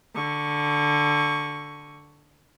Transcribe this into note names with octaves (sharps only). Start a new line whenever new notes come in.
D3 C#6